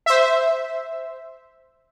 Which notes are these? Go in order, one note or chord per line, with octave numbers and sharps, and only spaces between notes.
C5 E5